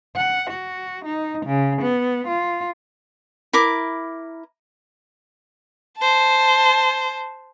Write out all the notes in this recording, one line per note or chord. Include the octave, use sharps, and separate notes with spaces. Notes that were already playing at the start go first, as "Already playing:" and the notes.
F#5
F#4
D#4
C#3
B3
F4
E4 A#4 D6
C5 A5